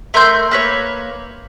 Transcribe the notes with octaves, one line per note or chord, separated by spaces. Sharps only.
A3 A#4 C6 G6
A#3 B4 C#5